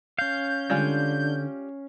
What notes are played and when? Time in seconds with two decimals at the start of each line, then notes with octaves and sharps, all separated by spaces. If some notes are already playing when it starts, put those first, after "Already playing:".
0.19 C#4 F5 G6
0.70 D3 G3 G#3 F4